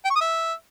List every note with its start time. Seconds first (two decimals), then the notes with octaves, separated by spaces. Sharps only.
0.05 G5
0.10 C#6
0.15 D#6
0.21 E5